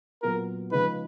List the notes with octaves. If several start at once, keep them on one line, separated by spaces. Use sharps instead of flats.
A#2 F#3 B3 F4 A#4
C#3 F3 G#3 D#4 B4